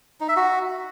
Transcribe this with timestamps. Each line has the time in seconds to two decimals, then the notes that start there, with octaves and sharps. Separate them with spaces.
0.20 D#4
0.28 E5
0.36 F#4